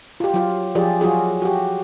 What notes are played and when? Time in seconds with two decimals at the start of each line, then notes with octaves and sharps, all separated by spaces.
0.20 F4 G4
0.34 F#3 F4
0.75 F3 F4 G4 G#4 D5
1.01 F#3 F4 F#4 G#4
1.42 F#4 G4